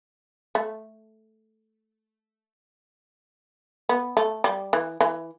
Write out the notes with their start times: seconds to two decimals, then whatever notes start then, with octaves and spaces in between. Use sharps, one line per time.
0.55 A3
3.89 B3
4.17 A3
4.44 G3
4.73 E3
5.01 E3